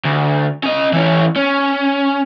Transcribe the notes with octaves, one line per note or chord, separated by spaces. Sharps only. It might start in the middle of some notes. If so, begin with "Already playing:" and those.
D2
C#4 D#5
E3 C#4
C#4